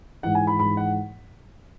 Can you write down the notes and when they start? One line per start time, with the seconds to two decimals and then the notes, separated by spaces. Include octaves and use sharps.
0.23 G#2 E3 F#5
0.35 G#5
0.47 B5
0.59 G#2 E3 B5
0.77 F#5